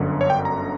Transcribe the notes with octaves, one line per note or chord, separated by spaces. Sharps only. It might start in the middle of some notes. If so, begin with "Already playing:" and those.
Already playing: G1 F#2 D3
C#5
G5
A#5